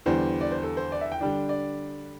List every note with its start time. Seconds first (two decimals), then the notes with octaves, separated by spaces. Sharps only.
0.06 E2 D3 G3 C5
0.41 D5
0.51 C5
0.63 A4
0.77 C5
0.92 D5
1.01 E5
1.12 G5
1.21 D3 G3 D4
1.49 D5